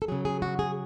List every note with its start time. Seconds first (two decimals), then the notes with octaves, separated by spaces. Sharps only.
0.02 A4
0.08 C#3 F#3 G#4
0.25 G#4
0.42 F#4
0.59 G#4